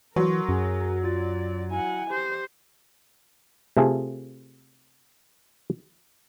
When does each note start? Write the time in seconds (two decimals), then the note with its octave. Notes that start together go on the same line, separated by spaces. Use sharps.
0.16 E3 F#3 F#4 A#4 C6 C#6
0.49 F#2 F#4 G#4 G#5
1.04 F4 D5 A6
1.71 E4 F#5 G#5
2.10 G4 C5
3.77 C3 A3 F4 G#4 A4 G#5